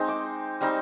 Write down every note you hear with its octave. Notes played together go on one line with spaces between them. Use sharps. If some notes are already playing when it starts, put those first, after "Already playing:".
Already playing: G#3 C4 D#4
D6
G3 C4 D#4